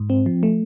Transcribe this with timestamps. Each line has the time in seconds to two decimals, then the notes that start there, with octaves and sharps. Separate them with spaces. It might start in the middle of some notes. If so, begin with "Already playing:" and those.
Already playing: G#2
0.10 C4
0.26 F3
0.43 A3